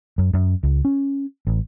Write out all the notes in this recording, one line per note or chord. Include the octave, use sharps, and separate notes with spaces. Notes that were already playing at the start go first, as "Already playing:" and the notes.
F#2
F#2
C#2
C#4
A1